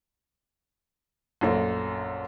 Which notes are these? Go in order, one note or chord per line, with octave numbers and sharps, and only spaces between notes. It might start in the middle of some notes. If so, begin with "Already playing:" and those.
A#1 F#2 A3